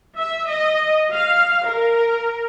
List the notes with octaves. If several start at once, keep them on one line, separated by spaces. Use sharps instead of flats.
E5
D#5
F5
A#4